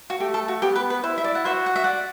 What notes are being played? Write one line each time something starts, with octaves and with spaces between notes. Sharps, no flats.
F#4
A3 G4
A4
F#4
B3 G4
B4
B4
E4 C5
E5
D5
F#5
F#4 C5 E5
F#5
E5
D5 F#5